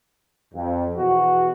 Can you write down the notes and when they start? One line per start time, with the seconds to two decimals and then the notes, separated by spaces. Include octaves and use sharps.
0.53 F2
0.96 E2 B2 F#4